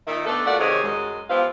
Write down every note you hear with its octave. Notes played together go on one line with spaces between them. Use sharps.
A#2 D#3 D#4 E5
A3 B3 D4 A4
A#2 A3 F#4 D5 F5 F#5
C3 D#3 G#3 G#4 C#5
F#2 G#3
F3 B3 E4 G4 C5 F5